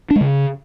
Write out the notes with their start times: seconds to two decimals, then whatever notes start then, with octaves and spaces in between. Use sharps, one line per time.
0.11 D4
0.16 G#3
0.21 C#3